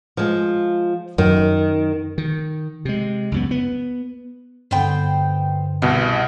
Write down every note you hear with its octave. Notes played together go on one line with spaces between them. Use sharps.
F3 G#3
F#2 D#3
D#3
C3 G#3
C#2 F#2 B3
B3
G2 D3 B3 C4 G5
C2 B2 D#4